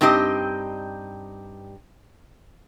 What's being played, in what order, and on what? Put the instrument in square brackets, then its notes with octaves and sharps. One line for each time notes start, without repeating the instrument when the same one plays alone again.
[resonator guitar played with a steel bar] G2 C4 D#4 G4 D#5